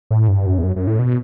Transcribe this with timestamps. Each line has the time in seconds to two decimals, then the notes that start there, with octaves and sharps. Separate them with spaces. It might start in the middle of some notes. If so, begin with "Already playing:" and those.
0.11 A2
0.28 G2
0.46 F#2
0.58 E2
0.64 F#2
0.76 F#2
0.87 A2
0.99 B2